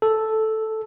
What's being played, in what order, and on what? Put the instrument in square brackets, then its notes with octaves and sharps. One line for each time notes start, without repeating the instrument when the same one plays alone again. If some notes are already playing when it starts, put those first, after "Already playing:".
[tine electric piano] A4